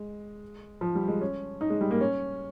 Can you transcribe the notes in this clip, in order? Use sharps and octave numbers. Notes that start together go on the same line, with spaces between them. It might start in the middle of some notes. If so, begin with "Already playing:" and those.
Already playing: G#3
F3
G3
G#3
C#4
D#4
G#3
G3
A#3
C#4